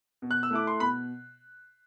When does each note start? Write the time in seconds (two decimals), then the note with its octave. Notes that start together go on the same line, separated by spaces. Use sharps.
0.22 B2
0.31 F#6
0.43 E6
0.51 A3 E4 D6
0.67 C6
0.80 B2 B5